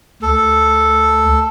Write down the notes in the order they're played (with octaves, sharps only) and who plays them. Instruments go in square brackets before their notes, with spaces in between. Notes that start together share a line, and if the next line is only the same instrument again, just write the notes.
[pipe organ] D2 [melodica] A4